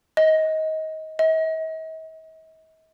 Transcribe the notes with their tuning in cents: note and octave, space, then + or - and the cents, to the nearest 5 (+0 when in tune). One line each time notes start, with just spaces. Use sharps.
D#5 +25
D#5 +45